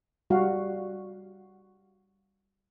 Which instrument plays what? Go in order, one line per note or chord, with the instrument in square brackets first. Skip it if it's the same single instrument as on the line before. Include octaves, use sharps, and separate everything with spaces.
[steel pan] G3 F#4 F5